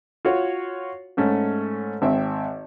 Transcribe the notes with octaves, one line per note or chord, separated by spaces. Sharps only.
F4 F#4 C#5
G#2 A3 C#4
G#1 C4 E5